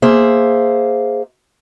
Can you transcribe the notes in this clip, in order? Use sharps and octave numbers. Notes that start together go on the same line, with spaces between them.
A#3 G#4 C5 E5